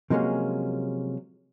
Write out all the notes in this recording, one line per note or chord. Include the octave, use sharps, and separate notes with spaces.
C3 F3 F#3 G#3 A#3 C#4